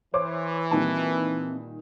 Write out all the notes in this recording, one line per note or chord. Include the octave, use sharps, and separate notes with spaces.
E3 C5 C#5 D6
A#2 D#3 G3 C4 G5 A5